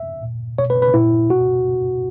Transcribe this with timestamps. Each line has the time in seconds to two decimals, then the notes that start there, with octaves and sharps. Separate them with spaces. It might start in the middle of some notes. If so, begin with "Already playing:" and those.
Already playing: E5
0.23 A#2
0.58 B2 C#5
0.70 B4
0.82 B4
0.94 A#2 E4
1.30 B2 F#4